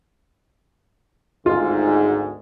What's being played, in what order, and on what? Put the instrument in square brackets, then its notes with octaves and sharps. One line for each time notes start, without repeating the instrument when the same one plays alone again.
[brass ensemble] G#1 D2 G#2 [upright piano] F4